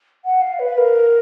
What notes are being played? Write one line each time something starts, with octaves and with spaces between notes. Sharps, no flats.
F#5
F5
B4
A#4